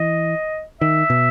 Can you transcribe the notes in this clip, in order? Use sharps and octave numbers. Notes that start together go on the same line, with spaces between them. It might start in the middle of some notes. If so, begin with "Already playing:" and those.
Already playing: E3 D#5
D#3 E5
B2